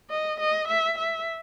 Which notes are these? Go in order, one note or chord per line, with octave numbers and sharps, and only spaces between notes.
D#5
D#5
E5
E5